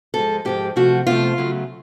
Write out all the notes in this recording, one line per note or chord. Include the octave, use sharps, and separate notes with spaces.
G#2 F3 G#3 A4
G#2 F3 G#3 G4
C3 F3 A3 F#4
C3 F3 A3 F4
C#3 F#3 A3